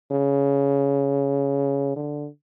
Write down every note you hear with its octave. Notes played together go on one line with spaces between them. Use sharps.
C#3
D3